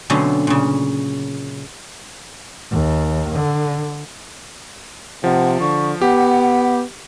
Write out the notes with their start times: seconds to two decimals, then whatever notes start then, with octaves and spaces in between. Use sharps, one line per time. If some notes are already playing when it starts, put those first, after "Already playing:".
0.10 B2 D3 F#3 A3 C4 C#4
0.47 A#2 C#3
2.71 D#2
3.35 D3
5.24 C3 F3 F#5
5.61 D3 C#6
6.01 B3 G4 F#5